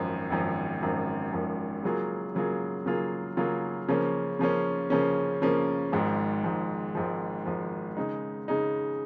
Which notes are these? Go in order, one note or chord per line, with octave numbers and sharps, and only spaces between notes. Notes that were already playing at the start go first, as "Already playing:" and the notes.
Already playing: G#1 F#2 F3
G#1 F#2 F3
G#1 F#2 F3
G#1 F#2 F3
C#3 F#3 A#3 F4 G#4
C#3 F#3 A#3 F4 G#4
C#3 F#3 A#3 F4 G#4
C#3 F#3 A#3 F4 G#4
C#3 F3 A#3 C#4
C#3 F3 A#3 C#4
C#3 F3 A#3 C#4
C#3 F3 A#3 C#4
G#1 G#2 F3
G#1 G#2 F3
G#1 G#2 F3
G#1 G#2 F3
C#3 G#3 D#4
C#3 G#3 D#4